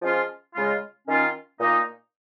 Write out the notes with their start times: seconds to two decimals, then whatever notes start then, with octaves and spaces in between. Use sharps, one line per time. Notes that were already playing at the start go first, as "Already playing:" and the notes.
0.02 F3 G#3 C#4 F4
0.55 C#3 G#3 F4
1.07 D#3 C#4 F4
1.60 A#2 A#3 D#4